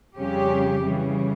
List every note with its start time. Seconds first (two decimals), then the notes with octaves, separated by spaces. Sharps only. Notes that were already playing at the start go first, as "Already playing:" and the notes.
0.16 F2 C#3 G3 C#4 G4
0.82 C#3 E3 G3